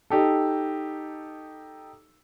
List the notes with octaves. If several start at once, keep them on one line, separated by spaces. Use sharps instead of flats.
D#4 G4 A4